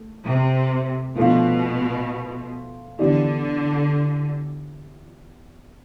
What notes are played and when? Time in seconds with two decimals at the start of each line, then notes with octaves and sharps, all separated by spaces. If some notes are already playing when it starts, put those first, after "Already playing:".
Already playing: A3
0.25 C3
1.16 B2 F3 A3 D4 F4
2.99 D3 E3 B3 D4 G4 D5